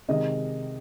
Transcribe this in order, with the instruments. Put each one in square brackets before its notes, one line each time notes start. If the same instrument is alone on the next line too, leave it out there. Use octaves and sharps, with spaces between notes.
[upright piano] C3 D#3 G#3 D#4 D#5